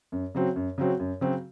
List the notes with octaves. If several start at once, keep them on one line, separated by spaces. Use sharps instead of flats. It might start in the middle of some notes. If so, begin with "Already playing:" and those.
F#2
C#3 F#3 C4 F#4
F#2
C#3 F#3 C4 F#4
F#2
C#3 F#3 C4 F#4